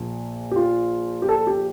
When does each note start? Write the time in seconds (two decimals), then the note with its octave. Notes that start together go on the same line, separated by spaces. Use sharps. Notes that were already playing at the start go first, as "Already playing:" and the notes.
Already playing: A#1 A#2
0.51 G4
0.56 F4
1.22 G4
1.29 A4
1.47 G4